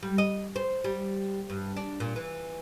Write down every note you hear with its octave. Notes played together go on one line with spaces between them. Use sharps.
G3
D#5
C5
G3
G2
D4
A#2
E3